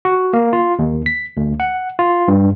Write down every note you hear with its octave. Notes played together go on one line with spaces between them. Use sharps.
F#4
A#3
F4
D#2
B6
D2
F#5
F4
G2